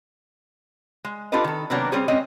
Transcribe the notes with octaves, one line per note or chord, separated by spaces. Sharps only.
G#3
D4 F4 G4 A4 B4 D#5
D#3 A4
C3 D#3 F#3 A#3 B3 D4
G3 C4 C#4 G#4 C5
G3 G#3 C4 C#4 D#5